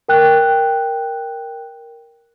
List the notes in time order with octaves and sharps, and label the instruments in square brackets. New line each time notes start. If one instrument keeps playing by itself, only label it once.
[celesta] A#4 G5 F#6